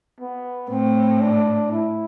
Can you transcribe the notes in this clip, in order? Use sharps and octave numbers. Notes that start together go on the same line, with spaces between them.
B3
A2 C4
D4
E4